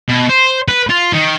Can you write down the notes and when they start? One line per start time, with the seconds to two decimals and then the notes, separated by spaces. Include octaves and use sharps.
0.09 B2
0.30 C5
0.68 B4
0.89 F4
1.13 D#3